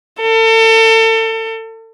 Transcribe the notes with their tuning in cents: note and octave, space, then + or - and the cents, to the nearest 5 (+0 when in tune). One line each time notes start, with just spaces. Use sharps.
A4 +35